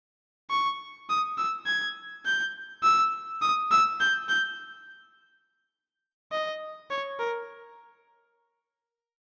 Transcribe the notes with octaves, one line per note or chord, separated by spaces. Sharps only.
C#6
D#6
E6
G#6
G6
E6
D#6
E6
G6
G6
D#5
C#5
A#4